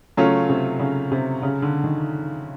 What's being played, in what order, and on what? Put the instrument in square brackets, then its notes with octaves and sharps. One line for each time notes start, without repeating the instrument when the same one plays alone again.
[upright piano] C#3 [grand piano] F#3 A3 C#4 F4
[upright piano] C3
C#3
C3
C#3
D3
D#3